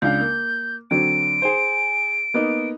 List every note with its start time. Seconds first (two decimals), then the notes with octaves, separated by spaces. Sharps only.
0.02 C#2 D4 F5 G6
0.21 A#3
0.91 D3 F#3 C4 D7
1.42 G#4 C5
2.34 A#3 B3 D#4